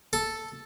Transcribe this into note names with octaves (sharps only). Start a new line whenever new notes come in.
A4